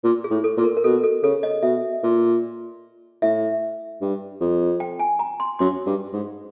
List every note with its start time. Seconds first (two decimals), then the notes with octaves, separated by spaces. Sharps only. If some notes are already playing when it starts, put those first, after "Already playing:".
0.04 A#2
0.24 G#4
0.31 A2
0.44 A4
0.57 A#2
0.64 A#4
0.77 A#4
0.84 B2 A4
1.03 A4
1.23 C#3 A4
1.43 D#5
1.63 B2 E5
2.03 A#2
3.22 A2 E5
4.02 G2
4.41 F2
4.80 G5
4.99 G#5
5.19 A#5
5.40 C6
5.59 F#2 C6
5.86 G2
6.13 G#2